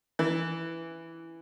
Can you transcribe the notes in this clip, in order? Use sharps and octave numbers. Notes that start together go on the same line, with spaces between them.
E3